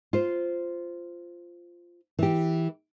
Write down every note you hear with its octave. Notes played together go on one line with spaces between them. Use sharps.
F4 C5
E3 G4